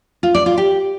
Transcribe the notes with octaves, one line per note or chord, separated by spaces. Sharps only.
F4
D5
F4
G4